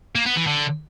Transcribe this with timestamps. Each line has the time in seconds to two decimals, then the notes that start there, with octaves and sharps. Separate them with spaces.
0.16 A#3
0.26 B3
0.36 E3
0.47 D3